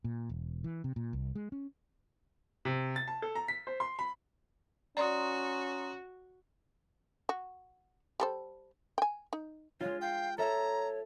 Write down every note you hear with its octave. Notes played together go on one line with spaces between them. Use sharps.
A#2
E1
E3
C3
A#2
C2
G#3
C#4
C3
A6
A5
A4
A#5
B6
C5
C6
B5
C#4 F#4 D5 A#5 C6 D#6
F#4
G3 A4 C5
G5 G#5
D#4
G#3 F4 C#5
F5 G5
A4 C#5 E5 A#5